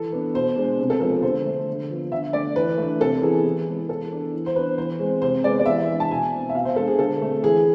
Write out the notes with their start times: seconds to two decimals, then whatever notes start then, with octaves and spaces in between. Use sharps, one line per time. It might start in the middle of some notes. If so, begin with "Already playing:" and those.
Already playing: E3 A4
0.12 B3 D4
0.34 B2 C5
0.56 G#3 D4
0.79 C3
0.90 A4
1.00 F3 G#3 B3 A4
1.23 D3 C5
1.46 A3 D4
1.68 D3
1.90 F3 B3
2.12 D3 E5
2.33 A3 D4 D5
2.56 E3 B4
2.78 A3 D4
3.01 C3 A4
3.22 E3 B3 G#4
3.45 E3
3.67 G#3 B3
3.89 E3 A4
4.11 B3 D4
4.33 E3
4.46 C5
4.55 B3 D4 B4
4.77 E3 C5
4.99 G#3 C4
5.22 C3 C5
5.43 G#3 D5
5.47 B3
5.59 D5
5.66 E3 E5
5.89 G#3 D4
6.00 A5
6.10 B2 G#5
6.32 A3 C4
6.49 E5
6.55 B2 F5
6.65 C5
6.76 G#3 A4
6.79 D4
6.88 G#4
6.99 D3 A4
7.21 A3 C4
7.43 E3 G#4